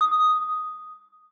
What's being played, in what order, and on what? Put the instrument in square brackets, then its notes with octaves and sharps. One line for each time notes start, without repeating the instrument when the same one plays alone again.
[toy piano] D#6